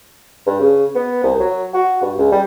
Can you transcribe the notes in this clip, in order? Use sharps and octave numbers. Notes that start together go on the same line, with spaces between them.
G2
C#3
B3
C2
F#3
F#4
G2
C#2
G3